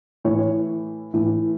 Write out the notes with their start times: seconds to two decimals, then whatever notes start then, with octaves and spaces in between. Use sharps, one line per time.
0.25 A2 E3 C#5
1.14 A2 E3